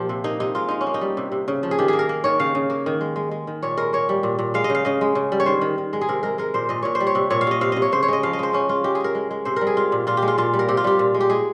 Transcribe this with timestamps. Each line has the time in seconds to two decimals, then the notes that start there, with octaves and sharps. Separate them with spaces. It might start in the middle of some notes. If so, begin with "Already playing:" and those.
Already playing: A#2 F3 G4
0.09 C3
0.24 A#3 D#4
0.40 C3 D#4
0.55 G#3 F4
0.69 G#3 D#4
0.81 C#4
0.87 A#3
0.94 D#4
1.01 G3
1.17 C3
1.32 C3
1.48 C#3
1.63 F3
1.71 G#4
1.78 D#3 G4
1.88 A#3 G#4
1.99 A#4
2.09 A#3
2.24 D#3 C#5
2.39 C#3 F5
2.55 C#3
2.70 A#3
2.86 D#3
3.01 G#3
3.16 G#3
3.31 G#3
3.47 D#3
3.62 A#2 C#5
3.77 G#3 A#4
3.93 A#3 C#5
4.09 G3
4.23 A#2
4.39 A#2
4.54 G#3 F5
4.64 D#5
4.70 C#3
4.75 F5
4.85 C#3 D#5
5.01 G#3
5.15 C#3
5.32 G3
5.40 C#5
5.46 D#3 C5
5.61 D#3
5.78 D#3
5.93 G#3
6.01 G#4
6.09 C3 A#4
6.23 G#3 A#4
6.38 G#3 A#4
6.54 A#2 C5
6.69 A#2 D#5
6.83 A#2 C#5
6.95 C5
7.00 G3
7.07 C#5
7.15 C3
7.30 A#2 C#5
7.41 F5
7.47 A#2 D#5
7.61 C3 F5
7.72 C3 D#5
7.82 C#5
7.92 C#3 C5
8.03 C#5
8.08 G#3 D#5
8.23 F3 F5
8.33 D#5
8.39 G#3 C5
8.53 C#3 C#4
8.69 G#3 F4
8.84 G#3 G4
8.95 G#4
9.00 G#3 A#4
9.15 G#3
9.31 G#3
9.45 C3 C5
9.56 G3 A#4
9.67 G#4
9.77 G#3 F4
9.92 A#2
10.07 A#2 F4
10.17 G4
10.22 G#3
10.28 F4
10.38 A#2 F4
10.53 G3
10.59 A#4
10.68 C3 G4
10.77 F4
10.84 G3 G4
10.99 A#2
11.14 G#3
11.21 G4
11.30 G#3 G#4